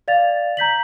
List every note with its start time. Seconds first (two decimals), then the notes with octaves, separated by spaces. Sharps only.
0.08 D5 F5 A6 F7
0.57 A#5 G6 B6 F#7